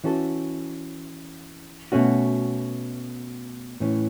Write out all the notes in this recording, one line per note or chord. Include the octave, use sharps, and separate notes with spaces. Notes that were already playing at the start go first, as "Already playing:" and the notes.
E3 C#4 F#4 A4
B2 A3 C#4 F#4
A2 E3 C#4